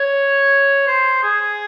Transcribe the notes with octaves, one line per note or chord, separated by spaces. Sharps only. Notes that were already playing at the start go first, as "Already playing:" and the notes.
Already playing: C#5
C5
G#4